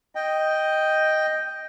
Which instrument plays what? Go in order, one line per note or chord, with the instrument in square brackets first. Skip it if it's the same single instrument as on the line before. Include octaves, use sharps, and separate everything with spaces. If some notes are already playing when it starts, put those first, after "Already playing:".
[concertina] D#5 G5